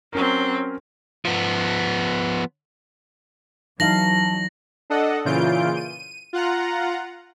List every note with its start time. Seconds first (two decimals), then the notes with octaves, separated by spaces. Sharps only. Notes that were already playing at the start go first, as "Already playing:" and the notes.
0.13 F#3 C4 C#4 A#4
1.25 F3 B3
3.80 E3 F#3 D#4 F5 A5 A#6 F#7
4.90 D4 A4 D#5 F#5
5.25 A#2 C#3 E3 F4 G6 D7
5.76 D#7
6.33 F4 F#5 A#5